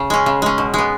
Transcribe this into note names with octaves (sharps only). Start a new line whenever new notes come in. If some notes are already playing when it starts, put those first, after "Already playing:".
Already playing: C#3
G#3 C#4
C#3
G#3 C#4
B2
G#3 B3